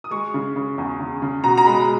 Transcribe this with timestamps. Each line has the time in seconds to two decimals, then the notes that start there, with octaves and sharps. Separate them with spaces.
0.04 D#6
0.11 G#3 C#6
0.34 C#3
0.56 C#3
0.78 E2
0.99 C#3
1.22 C#3
1.44 B2 A#5
1.57 A#5
1.66 G#3 B5